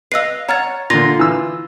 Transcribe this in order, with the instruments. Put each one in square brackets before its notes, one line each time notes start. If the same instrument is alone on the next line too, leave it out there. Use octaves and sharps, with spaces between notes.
[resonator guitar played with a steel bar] B4 D#5 F5 [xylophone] E6 C7
[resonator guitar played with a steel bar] C#5 F#5 [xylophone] A#5 F6 A6
[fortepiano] A#2 D3 [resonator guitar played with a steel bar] F4 [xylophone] A#6
[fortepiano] E3 E6